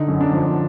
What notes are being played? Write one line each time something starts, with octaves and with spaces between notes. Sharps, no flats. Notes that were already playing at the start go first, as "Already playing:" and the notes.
Already playing: D3 D#4
F#2
D4
F3